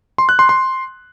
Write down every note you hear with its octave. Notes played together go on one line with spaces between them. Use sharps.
C6
F#6
C6
C6